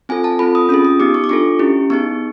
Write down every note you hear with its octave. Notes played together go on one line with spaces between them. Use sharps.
C4 F4 A4 G#5
A5
C4 F4 A4 B5
D#6
C#4 F4 G#4 D#6
D#6
B3 D#4 G4 D6
C#6
D6
D4 F4 A4 C#6
C#4 E4 G4
B3 D#4 G#4 C#6